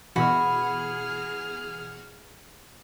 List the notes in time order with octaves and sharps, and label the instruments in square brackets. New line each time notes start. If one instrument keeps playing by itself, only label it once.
[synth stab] B2 E3 [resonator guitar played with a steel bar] F#4 [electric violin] G#4 F6 [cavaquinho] B5